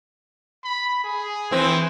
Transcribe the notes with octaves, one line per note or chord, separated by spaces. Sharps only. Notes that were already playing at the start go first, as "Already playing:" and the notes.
B5
G#4
E3 C4